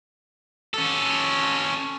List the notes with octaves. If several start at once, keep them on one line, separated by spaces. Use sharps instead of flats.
C#4 A4